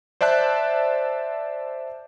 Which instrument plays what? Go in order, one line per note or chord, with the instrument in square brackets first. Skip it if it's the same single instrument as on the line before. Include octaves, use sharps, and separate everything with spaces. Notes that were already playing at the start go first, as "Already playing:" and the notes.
[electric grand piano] C5 D5 E5 A5 F#6